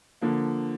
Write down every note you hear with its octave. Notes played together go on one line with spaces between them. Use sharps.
D3 F3 A#3